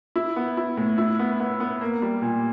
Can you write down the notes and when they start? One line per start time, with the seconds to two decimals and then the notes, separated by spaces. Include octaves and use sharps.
0.16 E4
0.36 B3
0.57 E4
0.77 A2
0.98 E4
1.19 B3
1.40 B3
1.60 B3
1.81 A#3
2.02 G3
2.22 A#2